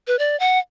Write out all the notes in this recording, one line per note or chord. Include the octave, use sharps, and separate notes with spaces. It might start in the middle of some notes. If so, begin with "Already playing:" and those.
B4
D5
F#5